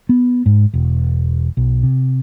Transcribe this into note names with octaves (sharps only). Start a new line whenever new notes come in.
B3
G#2
E1
B1
C3